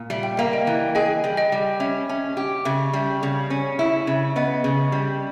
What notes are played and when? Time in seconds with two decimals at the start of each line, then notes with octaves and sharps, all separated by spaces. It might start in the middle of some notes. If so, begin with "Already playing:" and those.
Already playing: A#2
0.10 G3 E5
0.23 G5
0.37 A#3 E5
0.53 D#5 G5
0.67 E3
0.95 G#4 D#5 G5
1.24 G3
1.37 D#5 G5
1.52 G3
1.80 C#4 E5
2.09 C#4
2.37 G4
2.65 C#3 E5
2.93 G3
3.23 C#3
3.50 C#4
3.79 E4
4.07 C#3
4.36 B3 D#5
4.64 C#3
4.92 G3